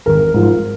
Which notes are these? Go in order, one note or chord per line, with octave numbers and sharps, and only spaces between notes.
G#1 A#4
G#2 F3